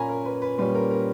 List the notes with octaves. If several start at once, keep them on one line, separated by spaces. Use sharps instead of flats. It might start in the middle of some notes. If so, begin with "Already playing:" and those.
Already playing: A#2 A#3 C#4 G#5 A#5 B5
A#4
B4
B4
A#2 G3 C#4 B4
A#4
A#4